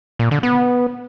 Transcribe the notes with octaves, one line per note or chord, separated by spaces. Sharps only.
A#2
D3
B3